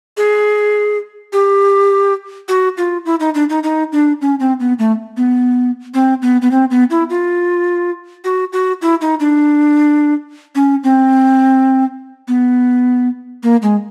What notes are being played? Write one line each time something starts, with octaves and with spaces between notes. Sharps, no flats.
G#4
G4
F#4
F4
E4
D#4
D4
D#4
D#4
D4
C#4
C4
B3
A3
B3
C4
B3
B3
C4
B3
E4
F4
F#4
F#4
E4
D#4
D4
C#4
C4
B3
A#3
G#3